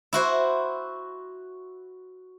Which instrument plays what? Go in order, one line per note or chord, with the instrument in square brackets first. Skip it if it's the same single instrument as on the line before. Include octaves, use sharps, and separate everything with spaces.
[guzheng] E4 F#4 C5